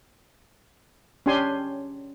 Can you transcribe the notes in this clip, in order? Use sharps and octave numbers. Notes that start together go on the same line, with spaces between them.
C#4 D4 G4 G#5 C6